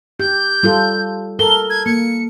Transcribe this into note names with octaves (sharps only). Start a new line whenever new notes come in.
G4 G6
G3 F4 A4
A4 A#4 G7
G#6
A#3 C#7